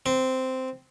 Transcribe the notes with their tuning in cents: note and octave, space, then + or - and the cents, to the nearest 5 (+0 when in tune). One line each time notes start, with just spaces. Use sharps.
C4 -10